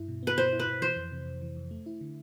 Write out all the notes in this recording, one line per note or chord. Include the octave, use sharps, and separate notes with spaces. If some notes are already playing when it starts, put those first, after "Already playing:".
Already playing: G2 E4
B2
B3 B4
B2 C5
E4
B4
B2
E3 C5
F2
C3
F2
E3
F2
A3
E4
D3